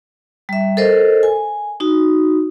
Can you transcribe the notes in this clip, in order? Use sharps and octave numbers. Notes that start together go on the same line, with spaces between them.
G3 E5
A4 A#4 C5 D#5
G#5
D#4 F#4